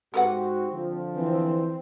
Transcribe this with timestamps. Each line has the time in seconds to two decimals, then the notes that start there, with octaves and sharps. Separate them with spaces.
0.14 G#2 C4 F#4 G4 A4 B4 F#5
0.72 D3 F3
1.15 E3 C4